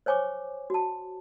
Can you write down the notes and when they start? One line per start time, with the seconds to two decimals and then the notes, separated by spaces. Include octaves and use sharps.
0.06 C5 C#5 G#5 C#6 D6
0.70 F#4 A5